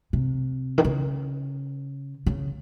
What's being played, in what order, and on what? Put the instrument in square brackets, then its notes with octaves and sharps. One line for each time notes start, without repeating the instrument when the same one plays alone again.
[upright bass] C3
D#3
C#3
C#3